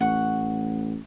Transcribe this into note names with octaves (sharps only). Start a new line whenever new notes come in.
A1 F#5 C#6